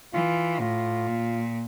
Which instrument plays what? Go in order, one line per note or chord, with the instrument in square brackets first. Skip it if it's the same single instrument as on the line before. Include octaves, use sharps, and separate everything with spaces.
[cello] E3 [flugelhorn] F4
[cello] A2 [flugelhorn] F4
[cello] A#2